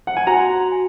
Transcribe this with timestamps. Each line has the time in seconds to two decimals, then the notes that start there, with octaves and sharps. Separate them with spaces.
0.07 F#5
0.17 G#5
0.27 F#4 F#5 A#5
0.72 G#5